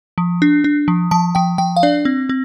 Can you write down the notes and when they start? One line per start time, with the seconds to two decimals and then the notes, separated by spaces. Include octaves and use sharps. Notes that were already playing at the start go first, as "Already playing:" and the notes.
0.18 F3
0.42 D4
0.64 D4
0.88 F3
1.11 F3 A5
1.35 F3 G5
1.58 F3 G5
1.76 F5
1.83 D4 D5
2.05 C4
2.29 C4